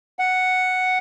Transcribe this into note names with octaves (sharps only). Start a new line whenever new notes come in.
F#5